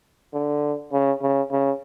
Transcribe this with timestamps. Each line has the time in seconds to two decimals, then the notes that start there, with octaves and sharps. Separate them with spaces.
0.33 D3
0.92 C#3
1.21 C#3
1.51 C#3